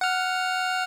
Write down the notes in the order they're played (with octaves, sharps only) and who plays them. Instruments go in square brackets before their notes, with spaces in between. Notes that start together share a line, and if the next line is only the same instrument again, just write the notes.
[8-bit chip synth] F#5 F6